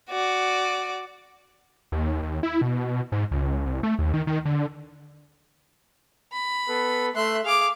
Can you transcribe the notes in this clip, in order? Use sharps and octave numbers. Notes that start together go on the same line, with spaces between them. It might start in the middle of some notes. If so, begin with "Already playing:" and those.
F#4 D5
D#2
D#2
E4
B2
G#2
C#2
C2
A3
D#2
D#3
D#3
D3
B5
B3 A4 B4
A3 E5 C6 F#6
G#4 F5 D6